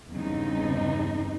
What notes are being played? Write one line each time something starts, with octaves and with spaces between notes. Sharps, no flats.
E2 G2 C#3 C4 D#4